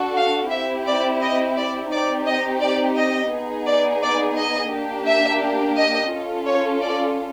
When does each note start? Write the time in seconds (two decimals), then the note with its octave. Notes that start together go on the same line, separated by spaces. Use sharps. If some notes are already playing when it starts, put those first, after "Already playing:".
Already playing: D4 F#4 A4
0.16 F5
0.51 C4 E4 G4 E5
0.86 D5
1.21 D#5
1.57 D5
1.91 C4 D#4 G4 D5
2.26 D#5
2.61 D5
2.96 D#5
3.31 B3 D#4 G#4
3.66 D5
4.02 D5
4.37 D#5
4.72 A#3 D4 G4
5.07 E5
5.76 D#5
6.11 C#4 F4 A4
6.47 C#5
6.82 D5